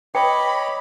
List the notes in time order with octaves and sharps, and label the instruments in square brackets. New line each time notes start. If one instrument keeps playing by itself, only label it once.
[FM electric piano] B4 [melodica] C#5 D#5 D6 [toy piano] G5 [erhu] B5